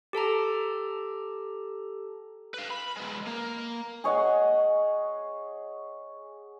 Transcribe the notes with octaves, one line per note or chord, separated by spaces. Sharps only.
G4 A4 A5 A#5
B4 F5
B5
G#3 B3
A#3
G#4 C#5 D#5 F#5